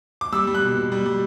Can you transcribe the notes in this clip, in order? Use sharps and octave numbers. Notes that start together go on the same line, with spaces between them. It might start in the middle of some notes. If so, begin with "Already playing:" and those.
D6
G3 E6
G3
F#6
B2
B2
G3
G3